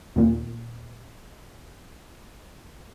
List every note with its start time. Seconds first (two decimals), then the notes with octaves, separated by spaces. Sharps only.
0.16 D#2 A#2